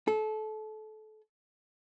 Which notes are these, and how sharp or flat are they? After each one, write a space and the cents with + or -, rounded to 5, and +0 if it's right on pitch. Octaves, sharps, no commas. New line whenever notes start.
A4 -25